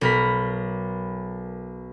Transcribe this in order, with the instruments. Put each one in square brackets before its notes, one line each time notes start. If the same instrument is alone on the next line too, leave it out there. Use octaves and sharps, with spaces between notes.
[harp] B1 A#4 B5